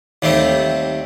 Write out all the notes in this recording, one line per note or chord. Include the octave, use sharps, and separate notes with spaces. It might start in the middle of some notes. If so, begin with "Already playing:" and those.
D#2 G3 A3 C4